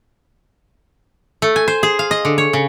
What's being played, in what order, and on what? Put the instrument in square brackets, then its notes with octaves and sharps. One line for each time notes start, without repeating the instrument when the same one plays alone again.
[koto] A3
G#5
C5
G#4
F5
D#5
D3
C#5
C#3